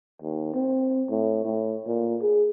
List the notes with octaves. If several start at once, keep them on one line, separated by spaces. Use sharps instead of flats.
D#2
C4
A2
A2
A#2
G#4